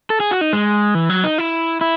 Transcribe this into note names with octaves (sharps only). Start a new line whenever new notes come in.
A4
G#4
F#4
D#4
G#3
E3
F#3
D#4
E4
E4